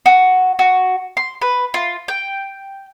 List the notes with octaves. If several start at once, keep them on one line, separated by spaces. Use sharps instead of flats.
F#4
F#4
C6
B4
F4
G5